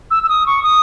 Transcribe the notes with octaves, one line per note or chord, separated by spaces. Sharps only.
E6
E6
D#6
C#6
D#6